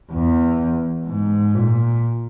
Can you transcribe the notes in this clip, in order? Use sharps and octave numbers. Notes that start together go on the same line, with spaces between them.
E2
G#2
A#2